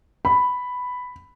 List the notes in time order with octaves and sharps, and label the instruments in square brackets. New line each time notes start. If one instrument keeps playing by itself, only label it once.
[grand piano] B5